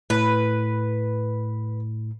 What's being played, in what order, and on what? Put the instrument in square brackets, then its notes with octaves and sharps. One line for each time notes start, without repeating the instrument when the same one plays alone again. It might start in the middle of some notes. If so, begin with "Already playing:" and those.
[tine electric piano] A2 [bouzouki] B4